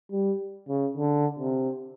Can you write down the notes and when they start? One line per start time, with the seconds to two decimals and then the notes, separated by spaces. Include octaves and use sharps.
0.12 G3
0.69 C#3
0.97 D3
1.39 C3